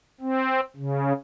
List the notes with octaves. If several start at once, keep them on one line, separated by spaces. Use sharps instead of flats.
C4
C#3